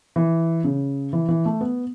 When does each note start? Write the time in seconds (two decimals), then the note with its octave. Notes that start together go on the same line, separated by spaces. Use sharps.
0.16 E3
0.64 C#3
1.13 E3
1.28 E3
1.45 A3
1.61 B3